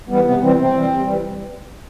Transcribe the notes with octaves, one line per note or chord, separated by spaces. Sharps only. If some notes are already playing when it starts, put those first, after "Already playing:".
E3 G3 B3
C3 B3
E3 G3 C4
C3 C4
E3 G3
C3
E3 G3